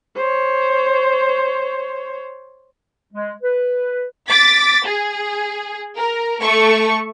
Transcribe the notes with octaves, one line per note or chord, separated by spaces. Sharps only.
C5 C#5
G#3
B4
D6 A6 B6
G#4
A#4
A3 C#6